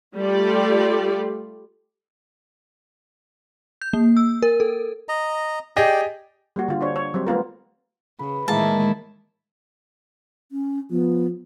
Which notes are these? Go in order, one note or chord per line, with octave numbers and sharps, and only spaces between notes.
G3 A3 F4 G4 A4 D5
G6
A#3
E6
A#4
A4
D#5 A#5
G4 G#4 D5 D#5 G5
G3 A#3 F#4
D3 F4
D4 C5 C#5
C#5
F#3 G3 C4 C5
A3 B3 F4 A#4
C#3 B4
A2 D#3 E3 G#3 A#3 E4 A5
C#4
F3 B3